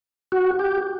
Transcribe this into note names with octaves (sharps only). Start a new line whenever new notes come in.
F#4
G4